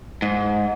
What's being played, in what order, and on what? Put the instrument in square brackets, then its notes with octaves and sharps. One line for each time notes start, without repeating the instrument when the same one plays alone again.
[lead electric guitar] G#2